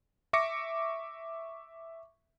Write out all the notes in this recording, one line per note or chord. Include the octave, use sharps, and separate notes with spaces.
E5 C#6 D6 A#6 C#7